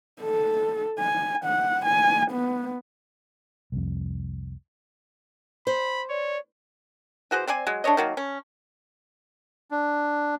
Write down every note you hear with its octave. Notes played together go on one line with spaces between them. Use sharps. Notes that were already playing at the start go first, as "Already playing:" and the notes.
A4
G#5
F#5
G#5
B3
C2 F2
C5 B5
C#5 D5
E3 F#4 G#4 C5
C4 C5 D5 G#5
F#3 G#3
D4 A4 C#5 D#5
D#3 F#3 A#3
C#4
D4